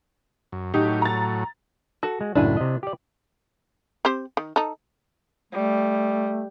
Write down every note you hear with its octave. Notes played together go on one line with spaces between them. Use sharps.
F#2
A2 F#3 D#4 G4
A#5 A6
F#4 A4
G#3
C#2 F#2 A2 D4 E4 G#5
C3 D#5
G4 D5
C4 G4 C5
D#3
D#4 A4
G3 A3